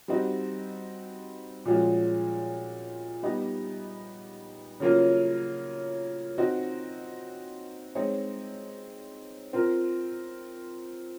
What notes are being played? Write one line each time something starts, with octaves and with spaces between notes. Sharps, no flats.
G3 C4 D#4 F#4
A#2 F3 G#3 C#4 F#4
G3 B3 D#4 G4
C#3 F#3 A#3 C#4 F4
C4 D#4 F#4
G#3 C4 D#4 G#4 C#5
C4 F4 A#4